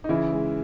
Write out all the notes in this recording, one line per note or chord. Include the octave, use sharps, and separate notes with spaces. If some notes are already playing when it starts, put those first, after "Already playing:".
D#4
C#3 E3 E4
G#3